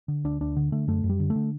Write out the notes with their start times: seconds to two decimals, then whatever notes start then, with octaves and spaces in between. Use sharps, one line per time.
0.08 D3
0.24 D2 D4
0.41 D2 D4
0.56 D3
0.72 D3 A3
0.88 F#2 A3
1.04 F#2
1.09 G3
1.20 D3
1.30 A3
1.36 D3